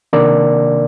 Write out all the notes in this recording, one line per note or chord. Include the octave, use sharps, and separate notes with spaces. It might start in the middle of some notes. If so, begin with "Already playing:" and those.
C3 D#3 A#3 D4 A#4 D5